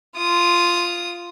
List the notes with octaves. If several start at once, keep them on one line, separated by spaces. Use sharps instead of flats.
F4 D#6